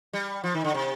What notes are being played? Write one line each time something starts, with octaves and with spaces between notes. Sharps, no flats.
G3
F3
D#3
D3
C3